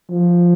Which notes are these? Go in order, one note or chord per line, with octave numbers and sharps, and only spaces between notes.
F3